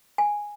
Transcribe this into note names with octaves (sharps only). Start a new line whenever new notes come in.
G#5